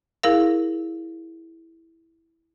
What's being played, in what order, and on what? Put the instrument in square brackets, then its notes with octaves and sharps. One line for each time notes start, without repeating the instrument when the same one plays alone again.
[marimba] E4 G#4 A#4 F5